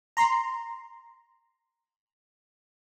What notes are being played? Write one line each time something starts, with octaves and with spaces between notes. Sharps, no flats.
A#5 C6